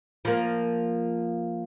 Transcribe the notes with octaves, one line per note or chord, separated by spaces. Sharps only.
F3 A#3